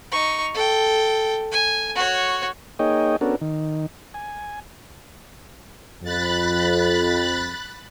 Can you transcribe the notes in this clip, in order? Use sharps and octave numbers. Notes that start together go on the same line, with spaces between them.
D#4 C#6
A4 G5
G#5
F#4 C#5
A#3 D#4 G#4 C#5 D#5 G5
B3 C#4 D4 F#4 A4 A#4
D#3
G#5
F2 B5 F#6 A6